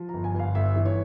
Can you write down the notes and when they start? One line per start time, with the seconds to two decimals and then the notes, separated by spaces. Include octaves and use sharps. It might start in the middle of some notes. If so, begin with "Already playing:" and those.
Already playing: F3
0.09 G1 A#5
0.24 G#5
0.34 G1 F5
0.55 G1 E5
0.76 E3
0.86 C#5